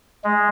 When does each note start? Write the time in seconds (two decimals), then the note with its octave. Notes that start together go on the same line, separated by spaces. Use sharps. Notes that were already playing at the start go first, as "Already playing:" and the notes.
0.24 G#3